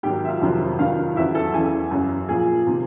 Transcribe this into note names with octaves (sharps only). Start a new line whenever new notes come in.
G#2 D#3 F#3 G4 G5
E5
F4 F5
F2 C3 D#3 F#3
G2 D#3 F#3 F4 F5
E2 C#3 F#3 E4 E5
A4 A5
E2 C#3 E3 G#4 G#5
F#2 C#3 F#3
A#2 F3 G#4 G#5
C3 D#3